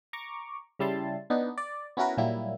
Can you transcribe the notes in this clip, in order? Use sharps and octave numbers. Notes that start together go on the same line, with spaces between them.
A#5 C#6 D6
C#3 G3 E4 A5 C6
B3 D4 D#4
D5
B3 C#4 E4 F#4 A#4 B4
A#2 F#3 G3 A#3 E4